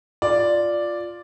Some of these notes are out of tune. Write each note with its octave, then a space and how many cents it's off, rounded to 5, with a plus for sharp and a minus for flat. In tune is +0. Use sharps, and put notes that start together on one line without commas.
F4 +0 D5 +0